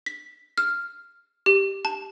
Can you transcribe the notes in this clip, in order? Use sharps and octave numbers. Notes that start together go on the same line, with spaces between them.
B6
F6
G4
A5